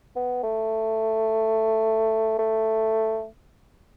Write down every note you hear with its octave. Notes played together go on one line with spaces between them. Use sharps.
B3
A3
A3